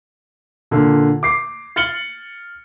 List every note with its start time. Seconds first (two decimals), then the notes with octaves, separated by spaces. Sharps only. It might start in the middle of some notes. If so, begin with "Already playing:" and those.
0.71 A#2 D3
1.23 D6 C7
1.76 F6 A6 C#7 F#7 G7